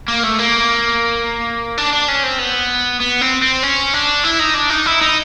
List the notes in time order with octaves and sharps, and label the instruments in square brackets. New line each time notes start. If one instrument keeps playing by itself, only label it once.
[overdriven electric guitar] A#3
A3
A#3
D4
D4
C#4
C4
B3
B3
C4
C4
C#4
D4
E4
D#4
D4
D#4
E4
D#4